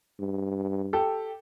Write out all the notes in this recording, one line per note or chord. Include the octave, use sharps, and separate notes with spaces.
G2
G4 A4